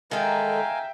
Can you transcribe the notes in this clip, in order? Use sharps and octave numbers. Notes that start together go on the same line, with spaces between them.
D#3 G#3 A4 E5 F5 G5 G#5 A#5